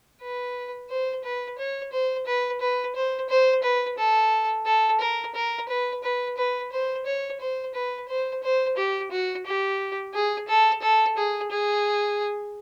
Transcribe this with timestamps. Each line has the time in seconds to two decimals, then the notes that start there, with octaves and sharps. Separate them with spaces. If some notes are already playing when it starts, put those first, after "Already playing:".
0.21 B4
0.89 C5
1.24 B4
1.58 C#5
1.93 C5
2.26 B4
2.61 B4
2.95 C5
3.29 C5
3.63 B4
3.98 A4
4.66 A4
5.00 A#4
5.35 A#4
5.69 B4
6.04 B4
6.37 B4
6.72 C5
7.06 C#5
7.40 C5
7.74 B4
8.08 C5
8.43 C5
8.77 G4
9.11 F#4
9.46 G4
10.14 G#4
10.48 A4
10.82 A4
11.17 G#4
11.51 G#4